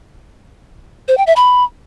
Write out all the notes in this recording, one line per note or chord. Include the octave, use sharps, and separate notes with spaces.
C5
G5
E5
B5